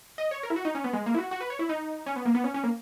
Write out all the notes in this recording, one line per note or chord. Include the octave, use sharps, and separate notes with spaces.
D#5
C#5
A#4
E4
F#4
D#4
C#4
B3
G#3
A#3
E4
F#4
F#4
B4
C#5
E4
D#4
C#4
B3
A#3
B3
C#4
C#4
A#3